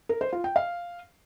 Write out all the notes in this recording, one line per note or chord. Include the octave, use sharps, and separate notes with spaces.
A#4
C5
F4
G5
F5